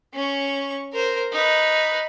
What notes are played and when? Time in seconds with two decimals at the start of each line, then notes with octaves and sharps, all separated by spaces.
0.13 C#4 C#6
0.93 A#4 C5
1.32 D#4 B4